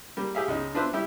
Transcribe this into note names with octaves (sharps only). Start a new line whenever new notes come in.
G3 A#3
G4 G#4 E5 F5
C#2 G#3 D#4
D4 F4 B4 C5 E5
G3 E4 G4